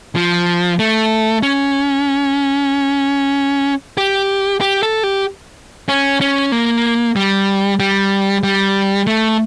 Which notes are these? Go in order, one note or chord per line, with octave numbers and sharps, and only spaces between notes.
F3
A3
C#4
G4
G4
A4
G4
C#4
C#4
A#3
G3
G3
G3
A3